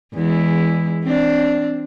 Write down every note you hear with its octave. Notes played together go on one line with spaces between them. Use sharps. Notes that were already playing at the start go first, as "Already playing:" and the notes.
E2 G#3 E4
C4 D4